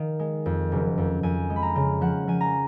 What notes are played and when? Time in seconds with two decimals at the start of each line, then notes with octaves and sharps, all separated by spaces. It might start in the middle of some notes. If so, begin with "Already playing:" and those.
Already playing: D#3 F5
0.19 G#3
0.46 F2
0.72 F#1
0.98 F2
1.23 F2 G#5
1.50 G#3
1.56 B5
1.62 A#5
1.75 C#3
2.01 F3 F#5
2.28 F3 G#5
2.41 A#5